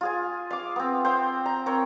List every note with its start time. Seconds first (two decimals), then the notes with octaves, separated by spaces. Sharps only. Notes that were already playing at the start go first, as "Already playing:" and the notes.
0.01 F4 G#4 G#5
0.51 F5 D6
0.76 B3 C4
1.05 C5 F5 G5 C6
1.46 A#5
1.66 C4 A#4 C#5